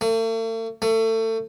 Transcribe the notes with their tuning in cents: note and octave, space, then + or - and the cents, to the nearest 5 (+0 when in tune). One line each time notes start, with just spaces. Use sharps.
A3 +45
A3 +30